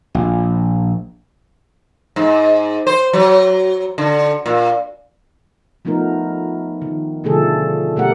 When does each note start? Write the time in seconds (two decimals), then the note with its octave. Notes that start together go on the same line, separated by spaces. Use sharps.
0.15 A#1
2.16 G#2
2.87 C5
3.13 F#3
3.98 D3
4.46 A#2
5.85 F3 A3 B3 D#4 A#4
6.82 D#3
7.24 B2 D3 F3 A3 G#4 A4
7.96 B2 A3 G4 A#4 F#5